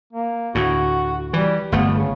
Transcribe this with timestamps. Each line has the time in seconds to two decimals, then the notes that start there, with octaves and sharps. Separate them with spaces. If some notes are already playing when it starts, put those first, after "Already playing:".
0.13 A#3
0.55 D2 A2 F#4
1.33 E3 G3
1.72 G1 A3 B3
1.95 C#3